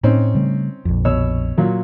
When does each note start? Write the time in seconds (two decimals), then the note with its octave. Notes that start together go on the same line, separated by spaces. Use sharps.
0.03 A2 C4 C#4 D#4
0.35 C#3 G3 A3
0.85 A#1 F2
1.05 B2 C#5 E6
1.58 A#2 F#3